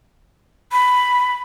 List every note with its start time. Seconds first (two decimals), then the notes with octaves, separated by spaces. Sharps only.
0.72 B5